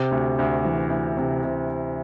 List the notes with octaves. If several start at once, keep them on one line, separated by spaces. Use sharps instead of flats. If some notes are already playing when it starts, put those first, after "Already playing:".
Already playing: C3
D2
D2
E3
D2
C3
C3